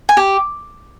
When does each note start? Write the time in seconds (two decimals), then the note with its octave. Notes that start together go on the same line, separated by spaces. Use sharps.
0.09 G#5
0.17 G4